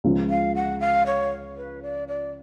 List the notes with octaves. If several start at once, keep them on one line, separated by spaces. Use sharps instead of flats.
C#2 C#3 F3
F5
F#5
F5
C#5
B4
D5
D5